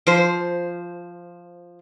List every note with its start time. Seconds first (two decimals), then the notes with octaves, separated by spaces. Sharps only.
0.07 F3 C5